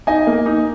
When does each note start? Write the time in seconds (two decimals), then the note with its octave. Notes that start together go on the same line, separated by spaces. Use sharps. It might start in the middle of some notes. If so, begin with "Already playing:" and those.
0.07 D#4 D#5 G#5
0.27 A#3
0.46 D#4